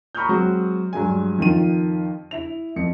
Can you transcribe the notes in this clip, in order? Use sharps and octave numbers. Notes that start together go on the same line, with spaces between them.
A#5 B5 C#6 D#6 F6 G6
F#3 G#3 C4 F#4
G2 F#3 G#3 G#5
F2 D#3 F4 D#7
E4 F7
F2 C#7